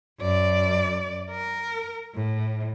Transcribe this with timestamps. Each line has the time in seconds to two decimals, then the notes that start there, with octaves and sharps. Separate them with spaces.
0.20 F#2 D5
1.31 A#4
2.15 A2